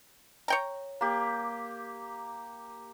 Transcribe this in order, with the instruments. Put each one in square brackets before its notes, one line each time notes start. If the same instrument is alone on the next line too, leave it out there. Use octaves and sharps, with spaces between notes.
[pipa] C#5 G5 A#5
[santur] A#3 G4